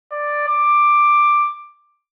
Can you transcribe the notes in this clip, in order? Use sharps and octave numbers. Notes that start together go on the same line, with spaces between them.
D5
D6